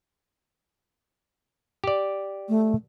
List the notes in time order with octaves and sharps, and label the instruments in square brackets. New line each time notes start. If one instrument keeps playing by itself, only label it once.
[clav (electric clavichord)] G4 D5
[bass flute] A3